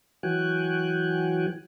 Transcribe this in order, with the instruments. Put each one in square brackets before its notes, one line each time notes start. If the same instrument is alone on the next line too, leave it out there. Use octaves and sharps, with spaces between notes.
[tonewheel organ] E3 F#3 F#4 G5 G#5 F#6